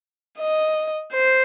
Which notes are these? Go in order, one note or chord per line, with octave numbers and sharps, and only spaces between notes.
D#5
C5